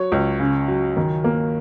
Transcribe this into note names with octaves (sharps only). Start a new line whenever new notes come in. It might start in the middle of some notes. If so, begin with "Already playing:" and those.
Already playing: F#3 C#5
C#2
C#3
F#3
D#3
A#3